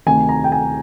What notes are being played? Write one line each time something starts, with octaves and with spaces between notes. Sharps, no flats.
D2 C3 D#3 G#5
A#5
G5
G#5